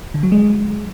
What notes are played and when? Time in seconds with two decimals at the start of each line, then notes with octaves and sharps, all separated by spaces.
0.14 D3
0.23 F#3
0.32 G#3